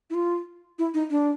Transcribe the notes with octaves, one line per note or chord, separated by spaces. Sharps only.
E4
F4
E4
D#4
D4